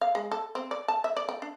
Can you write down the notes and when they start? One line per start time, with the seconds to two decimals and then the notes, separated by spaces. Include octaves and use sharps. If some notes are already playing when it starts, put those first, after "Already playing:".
0.01 F5
0.15 G#3
0.31 A4
0.55 C4
0.71 D5
0.88 A5
1.04 E5
1.17 D5
1.29 G5
1.42 D4